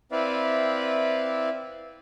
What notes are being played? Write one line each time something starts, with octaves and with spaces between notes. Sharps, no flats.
C4 E4 B4 D5 E5 F5